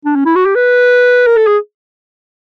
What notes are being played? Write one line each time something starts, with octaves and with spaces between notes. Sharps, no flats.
D4
C#4
E4
F#4
G4
B4
A#4
A4
G#4